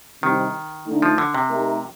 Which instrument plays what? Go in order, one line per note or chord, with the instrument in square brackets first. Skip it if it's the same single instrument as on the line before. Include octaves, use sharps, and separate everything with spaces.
[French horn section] C3 G3 C4 D#4 [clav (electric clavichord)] D#3
[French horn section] D3 A3 D#4
[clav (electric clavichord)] F3
D3
C3
[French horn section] A3 D#4 G4 A#4